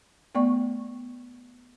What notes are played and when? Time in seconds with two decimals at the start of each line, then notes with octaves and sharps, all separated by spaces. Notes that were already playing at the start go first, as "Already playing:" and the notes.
0.35 A3 B3 D5 C#6